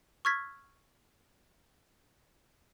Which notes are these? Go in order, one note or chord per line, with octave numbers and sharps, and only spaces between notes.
C#6 E6 F6 G#6 A6 B6